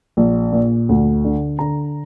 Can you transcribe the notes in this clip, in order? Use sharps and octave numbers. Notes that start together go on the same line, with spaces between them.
A#1
A#2
D2
D3
D3 A#5